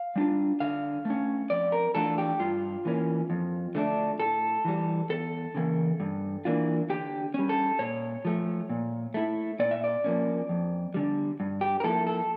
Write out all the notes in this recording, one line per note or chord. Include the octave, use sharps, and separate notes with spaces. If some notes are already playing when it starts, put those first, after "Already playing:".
Already playing: F5
G3 D4 F4
D3 F5
A3 C#4
F2 D5
A#4
E3 A3 D4 F4 A4
G4
G2 F4
E3 A#3 C#4
F2
D3 A3 D4
A2 A4
E3 G3
E2 A4
C#3 E3 A#3
G2
E3 A#3 D4 F4
D3 G4
G3 C#4
A4
A#2 C#5
F3 A3
A#2
A3 E4
A#2 D5
E5
D5
F3 A#3 C#4
F2
D3 G3
G2
G4
A#4
F3 A#3 E4 A4
A4